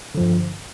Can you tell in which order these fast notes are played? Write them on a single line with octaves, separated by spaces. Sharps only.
D3 F3 G2